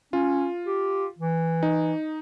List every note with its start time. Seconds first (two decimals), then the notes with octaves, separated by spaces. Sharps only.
0.13 C#4 F4
0.66 G4
1.19 E3
1.63 D#4